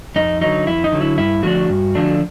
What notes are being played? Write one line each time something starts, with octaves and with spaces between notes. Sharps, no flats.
F2 D#4
D3 F#3 D#4
F2 E4
D#4
D3 F#3
E4
G2 E4
D3 F3 A3 D4 F#4
G2
D3 F3 A3 D4